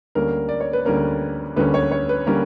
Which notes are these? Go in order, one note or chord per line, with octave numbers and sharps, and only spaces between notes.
D2 D3 G3 A#3 C#4 A#4
D5
C#5
B4
D2 D3 G3 A#3 C#4 A#4
D2 D3 G3 A#3 C#4 B4
C#5
C#5
B4
D3 G3 A#3 C#4 A#4